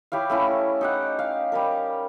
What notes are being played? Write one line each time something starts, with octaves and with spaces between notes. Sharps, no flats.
E4 G4 C#5 F5
A3 C#4 E4
D#4 G4 F#5
F5
G3 G4 A#4